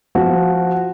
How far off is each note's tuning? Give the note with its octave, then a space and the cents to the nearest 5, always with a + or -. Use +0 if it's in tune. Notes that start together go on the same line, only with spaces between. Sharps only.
F3 +0 F#4 +0